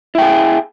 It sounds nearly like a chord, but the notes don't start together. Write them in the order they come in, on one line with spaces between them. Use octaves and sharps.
E4 G5 G#4